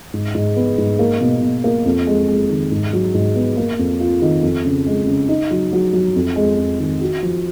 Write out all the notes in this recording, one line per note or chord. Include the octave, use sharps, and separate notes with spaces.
G#2
G#2
B3
G#2
A#3
B2
B2
A#3
F2
G#3
G#3
D#3
G#2
F#3
G#2
B3
A#3
F2
F4
D#3
F2
C#3
G#3
C#3
D#4
F#3
F#3
F#3
F2
G#3
F2
D#3
F#4
F3